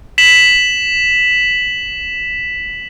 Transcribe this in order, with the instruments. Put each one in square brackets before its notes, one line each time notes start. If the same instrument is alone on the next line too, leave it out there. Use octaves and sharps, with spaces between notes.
[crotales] B6 E7 F#7